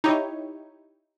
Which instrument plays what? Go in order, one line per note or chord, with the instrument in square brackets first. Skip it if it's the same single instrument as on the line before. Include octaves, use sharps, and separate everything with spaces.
[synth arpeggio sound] D#4 E4 G4 C#5